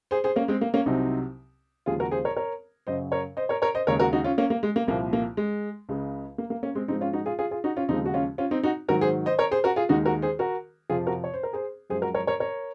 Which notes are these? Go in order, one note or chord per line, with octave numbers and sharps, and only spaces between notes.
G#4 C5
G#4 C5
A#3 C#4
G#3 C4
A#3
A#3 C#4
C2 C3 F#3 C4 D#4
D#2 C#3 F3 G#3 F4 G#4
F#4 A#4
G#4 C5
A#4 C#5
A#4 C#5
F#2 C#3 F#3 C5 D#5
A#4 C#5
C5 D#5
A#4 C#5
A#4 C#5
C5 D#5
D#2 C#3 G#3 A#4 C#5
F#4 A#4
D#4 F#4
C#4 F4
A#3 C#4
A#3
G#3
A#3
C2 A#2 F3 A#3
A#3
G#3
C#2 C#3 G#3
A#3
A#3
A#3 C#4
G#3 C4
G#2 F3 G#3 C4 D#4
C#4 F4
D#4 F#4
F4 G#4
F4 G#4
F4 G#4
D#4 F#4
C#4 F4
D#2 C#3 F3 G#3 C4 D#4
F#4
C#4 F4
C#4 F4
C4 D#4
D#4 F#4
G#2 D#3 F#3 F#4 A#4
G#4 C5
C5 D#5
A#4 C#5
G#4 C5
F#4 A#4
F4 G#4
D#2 D#3 G#3 D#4 F#4
F#4 A#4
G#4 C5
F#4 A#4
F2 C3 F3 F4 G#4
F#4 A#4
C#5
C5
A#4
G#4 C5
F#2 F3 G#3 G#4 C5
F#4 A#4
A#4 C#5
A#4 C#5
A#4 C#5